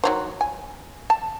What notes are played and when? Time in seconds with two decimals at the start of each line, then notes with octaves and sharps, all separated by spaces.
0.04 D#3 F#3 C5
0.41 G#5
1.10 A5